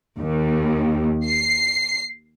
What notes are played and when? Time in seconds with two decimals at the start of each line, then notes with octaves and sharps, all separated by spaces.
0.20 D#2
1.25 C7